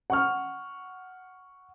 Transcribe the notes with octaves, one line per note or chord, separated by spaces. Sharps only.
F#5 C#6 F6